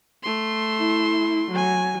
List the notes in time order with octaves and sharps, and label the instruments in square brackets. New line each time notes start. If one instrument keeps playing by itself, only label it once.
[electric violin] A3 C6
[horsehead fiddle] E4
F#3 G#5